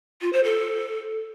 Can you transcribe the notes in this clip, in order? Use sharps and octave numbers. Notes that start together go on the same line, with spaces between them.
F4
C5
A4